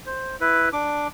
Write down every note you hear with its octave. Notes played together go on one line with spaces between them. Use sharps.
C5
E4 B4
D4 D6